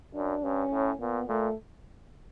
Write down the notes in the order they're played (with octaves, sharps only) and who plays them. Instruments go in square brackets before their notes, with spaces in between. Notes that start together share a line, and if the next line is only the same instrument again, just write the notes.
[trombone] F#2 [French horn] D4
[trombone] G2 [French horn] C#4
[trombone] A2
[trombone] A#2 [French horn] B3
[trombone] A#2 [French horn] A3